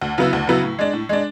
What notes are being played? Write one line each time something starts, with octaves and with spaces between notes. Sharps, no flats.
D2
C#3 F#3 B3 E4
D2
C#3 F#3 B3 E4
A2
G#3 D4
A2
G#3 D4